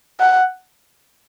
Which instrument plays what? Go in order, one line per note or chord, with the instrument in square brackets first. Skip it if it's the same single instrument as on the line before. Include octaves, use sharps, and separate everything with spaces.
[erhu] F#5